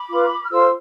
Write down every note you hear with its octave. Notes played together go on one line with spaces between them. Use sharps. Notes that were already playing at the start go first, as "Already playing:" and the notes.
Already playing: B5 D6
F4 B4
F6
F4 A4 C5 C6 E6